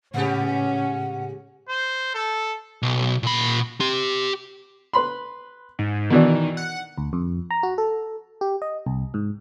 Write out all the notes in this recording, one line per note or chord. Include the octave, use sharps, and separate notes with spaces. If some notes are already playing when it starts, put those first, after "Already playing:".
A2 C#3 G#3 B3 C#4 G4 F#5
C5
A4
B1
A#2 B5
G4 C6
B4 B5 C6
G#2
B2 D#3 E3 D4
F#5
D2
F2
A#5
F#4
A4
G4
D#5
C2
G#2